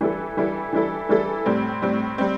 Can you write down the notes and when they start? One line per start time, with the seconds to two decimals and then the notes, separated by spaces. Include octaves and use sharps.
0.01 E3 G3 E4 A4
0.37 E3 G3 E4 A4
0.73 E3 G3 E4 A4
1.09 E3 G3 E4 A4
1.46 A2 G3 C4
1.82 A2 G3 C4
2.18 G3 C4